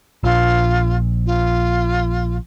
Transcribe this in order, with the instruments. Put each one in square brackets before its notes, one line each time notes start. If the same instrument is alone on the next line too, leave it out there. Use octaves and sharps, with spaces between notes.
[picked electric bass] A#1 [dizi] F4
[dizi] F4